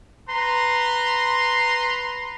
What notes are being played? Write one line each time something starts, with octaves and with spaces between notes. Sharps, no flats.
B4 A#5 C6